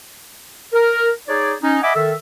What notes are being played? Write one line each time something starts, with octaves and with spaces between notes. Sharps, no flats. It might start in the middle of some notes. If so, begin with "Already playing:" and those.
A#4
D#4 G#4 C#5 D5
C#4 D#4
D#5 E5 F#5 G#5 B5 D6
D#3 A4 E5